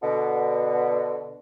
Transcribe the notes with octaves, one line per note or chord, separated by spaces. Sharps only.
B2 D3